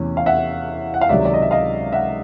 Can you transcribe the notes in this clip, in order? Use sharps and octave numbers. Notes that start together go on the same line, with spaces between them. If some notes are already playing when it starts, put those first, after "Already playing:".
Already playing: E2 C3 E3 A3 C#4
F5
E5 F#5
F#5
F5
C#2 C3 D#3 F#3 D5 E5
D5
D#5
E5
D#5 F5
E5 F#5